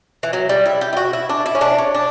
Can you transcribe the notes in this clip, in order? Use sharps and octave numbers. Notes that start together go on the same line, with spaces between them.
E3
F#3
G3
E4
G4
E4
F#4
E4
D4
E4
C#4
D4
C#4
D4